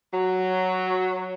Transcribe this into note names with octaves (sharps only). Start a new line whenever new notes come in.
F#3